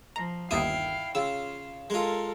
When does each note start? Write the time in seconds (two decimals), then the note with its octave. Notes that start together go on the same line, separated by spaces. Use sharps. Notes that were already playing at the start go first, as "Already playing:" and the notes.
0.16 F3 A#5
0.51 G1 D#2 E4 F5 G5 D#6
1.15 C#3 F4 E6
1.90 G#3 F4 A4 A#4